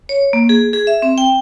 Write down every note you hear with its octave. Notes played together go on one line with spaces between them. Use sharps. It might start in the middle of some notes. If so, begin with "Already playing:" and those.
C#5
A#3
G#4
G#4
E5
C4
G5